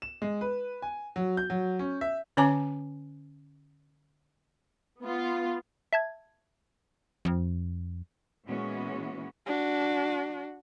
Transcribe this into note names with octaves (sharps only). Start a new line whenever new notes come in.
E7
G#3
B4
G#5
F#3
G6
F#3
C#4
E5
D3 C#4 C#5 G#5 A5 D6
B3 F4
E5 A5 G#6
F2
A#2 E3 G#3 B3 C#4 F#4
D4 F#4